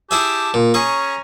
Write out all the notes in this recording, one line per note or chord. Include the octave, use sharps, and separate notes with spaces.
E4 G4 G#4 E5 A5
A#2
C#4 G#4 A#5 C#6